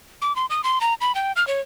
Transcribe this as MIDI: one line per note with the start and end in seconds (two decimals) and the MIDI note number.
0.22 0.35 86
0.36 0.46 84
0.50 0.61 87
0.64 0.79 84
0.81 0.94 82
1.01 1.15 83
1.15 1.32 79
1.36 1.46 89
1.47 1.61 73